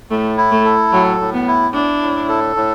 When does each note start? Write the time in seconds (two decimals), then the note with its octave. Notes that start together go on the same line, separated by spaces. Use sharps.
0.10 A2 A3
0.37 E4
0.51 A3
0.65 A4
0.93 A2 F#3
1.20 A2
1.33 B3
1.48 E4
1.74 D4 E4
2.02 A2
2.29 A4
2.56 A2